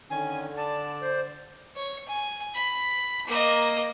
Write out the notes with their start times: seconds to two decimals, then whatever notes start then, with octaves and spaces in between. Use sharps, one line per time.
0.10 D3 D#3 C#4 G#5
0.57 D5 A5
1.01 C5
1.76 C#5
2.07 G#5
2.54 B5
3.26 A#3 D#5